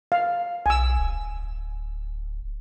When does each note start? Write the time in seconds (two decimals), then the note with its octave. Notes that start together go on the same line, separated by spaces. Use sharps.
0.12 F5
0.66 B1 G#5 E6
0.98 D1